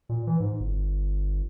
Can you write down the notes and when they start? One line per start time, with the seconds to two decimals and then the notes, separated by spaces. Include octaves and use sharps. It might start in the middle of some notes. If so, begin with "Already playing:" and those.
0.09 A#2
0.27 E3
0.40 G#2
0.60 G1